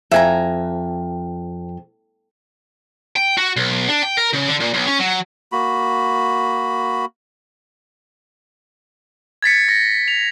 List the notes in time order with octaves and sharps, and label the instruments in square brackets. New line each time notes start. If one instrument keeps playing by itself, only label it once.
[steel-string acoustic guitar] F2 [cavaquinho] E5 G#5 A#5
[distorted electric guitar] G5
F#4
B1
D4
G5
A#4
C#3
D3
A#2
B1
C#4
F#3
[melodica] A#3 F#4 B5
[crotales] G#6 A6 B6 C#7
A#6 C#7
F7